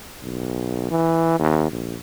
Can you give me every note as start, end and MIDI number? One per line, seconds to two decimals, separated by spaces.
0.23 0.87 35
0.91 1.36 52
1.40 1.67 39
1.71 1.96 34